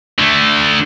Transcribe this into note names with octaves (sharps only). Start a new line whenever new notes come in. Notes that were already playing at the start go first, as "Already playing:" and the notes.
D3 A3